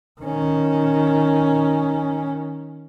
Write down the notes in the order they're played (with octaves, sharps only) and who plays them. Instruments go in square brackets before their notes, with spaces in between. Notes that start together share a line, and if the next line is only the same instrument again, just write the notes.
[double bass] D#3 C#4